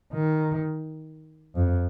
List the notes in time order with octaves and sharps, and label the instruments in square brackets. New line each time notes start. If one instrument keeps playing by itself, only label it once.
[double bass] D#3
F2